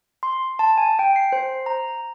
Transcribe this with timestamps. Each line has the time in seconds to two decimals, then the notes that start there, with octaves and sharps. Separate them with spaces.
0.23 C6
0.59 A5
0.78 G#5
0.99 G5
1.16 C7
1.32 C5
1.66 A#5